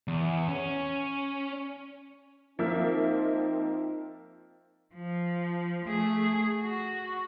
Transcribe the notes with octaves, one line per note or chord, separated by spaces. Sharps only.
E2
C#4
F3 A#3 C4 D#4 E5
F3
A3 G#4
F#4